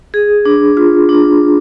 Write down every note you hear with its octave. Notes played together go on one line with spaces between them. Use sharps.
G#4
D4
F4
D4